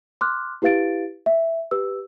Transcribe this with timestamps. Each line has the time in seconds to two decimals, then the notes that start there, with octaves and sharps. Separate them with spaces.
0.21 C6 D6 F6 F#6
0.62 E4 G4 B4 F5 A6 D7
1.26 E5
1.71 G4 B4 E6